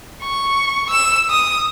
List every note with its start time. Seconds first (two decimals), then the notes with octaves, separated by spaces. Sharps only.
0.22 C#6
0.90 E6 E7
1.30 D#6